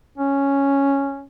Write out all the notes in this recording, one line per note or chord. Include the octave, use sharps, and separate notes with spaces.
C#4